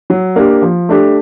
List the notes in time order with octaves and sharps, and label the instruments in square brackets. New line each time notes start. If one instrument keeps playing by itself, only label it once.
[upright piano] F#3
A#3 D4 G4
F3
A3 D4 G4